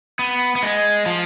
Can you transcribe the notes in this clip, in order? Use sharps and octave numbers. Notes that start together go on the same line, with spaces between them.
B3
B3
G#3
F3